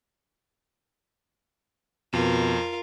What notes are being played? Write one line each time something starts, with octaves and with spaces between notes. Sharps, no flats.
F2 B2 F4 A#4